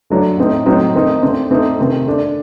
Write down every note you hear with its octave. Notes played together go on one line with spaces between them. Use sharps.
D3 F#3 A3 D4
A2 A3 C4 D#4
A2 F#3 C4 D#4
D#3 A3 C4 D#4
D3 A3 C4
D3 A3 C4 D#4
C3 D#3 A3 C4
D3 A3 D4